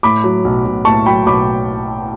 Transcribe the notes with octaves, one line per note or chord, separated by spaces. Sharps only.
A2 B5 D6
F#3
B1
B1
A2 A5 C#6
F#3 G5 B5
B1 B5 D6